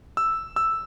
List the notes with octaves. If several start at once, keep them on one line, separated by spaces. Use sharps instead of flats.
E6
E6